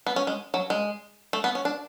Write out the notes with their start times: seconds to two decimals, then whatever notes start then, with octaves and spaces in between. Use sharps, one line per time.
0.06 B3
0.16 C#4
0.27 G#3
0.54 F#3
0.70 G#3
1.33 A3
1.44 B3
1.55 C#4
1.65 D4